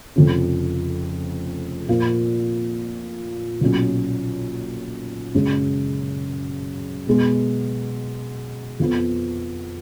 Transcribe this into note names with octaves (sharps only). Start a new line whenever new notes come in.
F1 F2 C#3
A#2 F3 A#3 F4
B1 A#2 F#3 C#4
F#1 F#2 C#3 G#3
B2 G#3 B3
F2 F3 B3